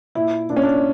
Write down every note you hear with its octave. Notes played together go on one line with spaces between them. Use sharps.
A#2 E4
A#2 D4
C#4
D4